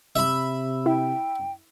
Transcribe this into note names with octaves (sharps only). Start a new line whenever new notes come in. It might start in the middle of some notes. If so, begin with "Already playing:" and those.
C3 E5 B5
E4 G5